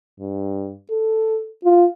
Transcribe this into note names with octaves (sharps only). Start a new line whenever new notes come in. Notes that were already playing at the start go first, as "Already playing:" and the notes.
G2
A4
F4